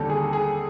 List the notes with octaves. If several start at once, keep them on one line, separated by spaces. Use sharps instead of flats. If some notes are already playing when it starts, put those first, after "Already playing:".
Already playing: D#2 D3 G3 A4
G#4
G#4